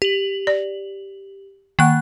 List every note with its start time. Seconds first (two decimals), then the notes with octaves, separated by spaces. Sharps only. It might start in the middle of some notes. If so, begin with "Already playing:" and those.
0.02 G4 F#7
0.47 D5
1.79 D#3 A#3 F#5 F#6